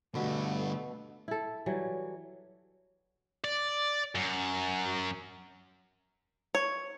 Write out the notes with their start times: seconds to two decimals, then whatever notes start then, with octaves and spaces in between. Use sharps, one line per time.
0.15 B2 D3 G3 A3
1.28 E4 A4
1.66 E3 F#3 G3
3.44 D5
4.15 F#2
6.55 C#5